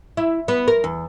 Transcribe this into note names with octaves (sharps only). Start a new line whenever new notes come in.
E4
B3
A#4
E2